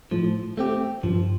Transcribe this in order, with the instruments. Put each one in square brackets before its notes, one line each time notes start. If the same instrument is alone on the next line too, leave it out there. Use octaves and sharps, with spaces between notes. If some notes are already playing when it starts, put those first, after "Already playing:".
[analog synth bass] A2 [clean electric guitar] F3
[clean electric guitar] A3 C4 G4
[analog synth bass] G2 [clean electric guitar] F3